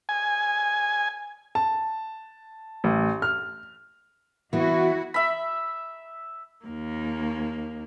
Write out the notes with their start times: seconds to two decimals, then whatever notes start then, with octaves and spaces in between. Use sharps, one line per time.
0.09 G#5
1.55 A5
2.84 A1
3.22 F6
4.53 E3 B3 E4 F#4
5.14 E5 B5
6.65 D#2 A#3